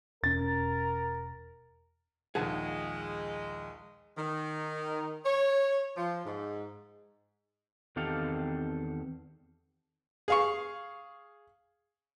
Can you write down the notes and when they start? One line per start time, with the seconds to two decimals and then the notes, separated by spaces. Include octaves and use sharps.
0.24 E1 C#4 A#4 A6
2.35 A#1 D#2 G#3 G#4 F#5 A5
4.17 D#3
5.25 C#5
5.96 F3
6.25 G#2
7.96 E2 D#3 C4 G4 A4 F5
10.28 G#4 F5 C#6